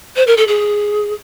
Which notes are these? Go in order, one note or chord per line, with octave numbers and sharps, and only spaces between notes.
C5
A#4
A4
G#4